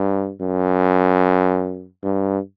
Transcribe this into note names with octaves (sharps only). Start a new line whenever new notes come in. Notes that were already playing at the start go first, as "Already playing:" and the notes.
Already playing: G2
F#2
G2